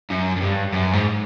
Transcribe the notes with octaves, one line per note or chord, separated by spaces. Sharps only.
F#2
F#2
G2
F#2
G#2